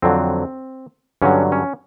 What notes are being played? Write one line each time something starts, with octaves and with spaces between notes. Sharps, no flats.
F2 D3 F#3 C4
G2 D3 F#3 C#4
C#4